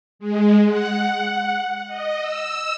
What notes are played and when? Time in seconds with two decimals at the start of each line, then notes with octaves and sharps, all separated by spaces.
0.19 G#3
0.68 F#5
1.87 D#5
2.21 E6